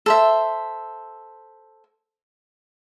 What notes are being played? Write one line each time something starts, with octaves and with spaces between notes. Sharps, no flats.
A4 C5 E5